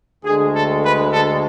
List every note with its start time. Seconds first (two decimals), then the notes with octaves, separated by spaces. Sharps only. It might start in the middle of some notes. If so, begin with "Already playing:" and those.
0.25 D2 D3 G#3 G#4
0.53 A4
0.83 B4
1.12 A4